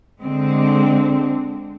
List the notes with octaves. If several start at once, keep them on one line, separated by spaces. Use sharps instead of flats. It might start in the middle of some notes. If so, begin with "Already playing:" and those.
D3 G#3 C4